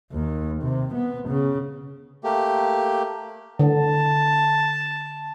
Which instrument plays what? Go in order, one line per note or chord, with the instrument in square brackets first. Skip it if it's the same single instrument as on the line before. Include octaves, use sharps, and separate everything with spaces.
[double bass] D#2
C3
B3
C#3
[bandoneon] A3 A#3 G4
[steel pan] D3 [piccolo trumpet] A5